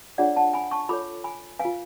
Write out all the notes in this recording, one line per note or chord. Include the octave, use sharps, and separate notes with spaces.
D4 F4 G#4 C#5 D5 F#5
F#5 A5
G#5 B5
A5 C#6
F4 A4 C#5 B5 D6
G#5 B5
B4 F5 G#5
F4